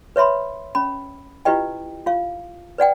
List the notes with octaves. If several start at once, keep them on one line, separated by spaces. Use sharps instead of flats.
B4 C#5 E5 B5 C6
C#4 B5
E4 F4 G4 B4 D#5 G5
F4 F5
B4 D5 F#5 G5